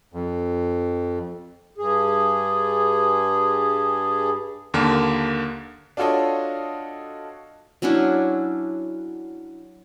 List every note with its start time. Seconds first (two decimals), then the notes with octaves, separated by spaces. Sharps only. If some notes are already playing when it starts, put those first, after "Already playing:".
0.13 F2
1.78 G2 G#4
4.74 D#2 D3 A#3
5.97 D4 F4 F#4 A4 C#5 D#5
7.82 F#3 C#4 D4 E4